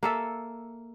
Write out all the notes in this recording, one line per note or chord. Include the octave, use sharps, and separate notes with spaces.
A#3 A4 E5